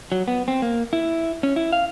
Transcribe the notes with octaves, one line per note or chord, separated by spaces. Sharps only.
F#3
B3
C4
A#3
E4
C#4
E4
F5